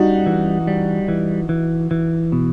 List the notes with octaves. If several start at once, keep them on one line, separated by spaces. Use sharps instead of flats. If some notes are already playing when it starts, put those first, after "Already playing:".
Already playing: G3 D#4 F#4
E3
G3
E3
E3
E3
B2